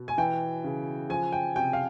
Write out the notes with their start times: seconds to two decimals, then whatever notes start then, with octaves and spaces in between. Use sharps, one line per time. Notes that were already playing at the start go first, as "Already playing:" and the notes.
Already playing: B2
0.08 G#5
0.18 E3 G5
0.64 C#3
1.10 F3 G#5
1.32 G5
1.56 C3 G5
1.73 F5